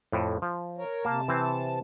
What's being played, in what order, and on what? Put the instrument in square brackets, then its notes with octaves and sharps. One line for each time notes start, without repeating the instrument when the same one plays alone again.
[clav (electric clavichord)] F2 A2
F3
[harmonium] A#4 C#5
[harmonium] C3 A5 [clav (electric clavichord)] A#3
[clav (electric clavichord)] E3 C4